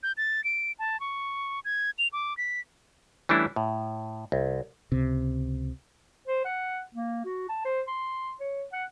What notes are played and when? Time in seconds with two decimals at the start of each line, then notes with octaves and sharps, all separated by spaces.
0.03 G6
0.17 A6
0.44 D7
0.79 A5
1.00 C#6
1.65 G#6
1.98 F7
2.13 D6
2.37 B6
3.29 E3 G3 A3 C#4 D4 E4
3.56 A2
4.32 C2
4.92 C#2 C3
6.27 C5
6.45 F#5
6.94 A#3
7.25 F#4
7.49 A5
7.65 C5
7.87 C6
8.40 C#5
8.73 F#5